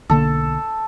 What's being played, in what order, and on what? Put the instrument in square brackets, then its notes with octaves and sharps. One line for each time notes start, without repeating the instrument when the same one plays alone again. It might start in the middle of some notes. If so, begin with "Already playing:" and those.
[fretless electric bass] B1 D3 A#3 [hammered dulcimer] A4